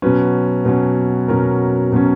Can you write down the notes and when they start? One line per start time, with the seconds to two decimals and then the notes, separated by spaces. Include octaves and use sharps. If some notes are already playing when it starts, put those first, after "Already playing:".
0.02 B2 F#3 C#4 B4
0.65 B2 F#3 C#4
1.28 B2 F#3 C#4 A#4
1.92 B2 F#3 C#4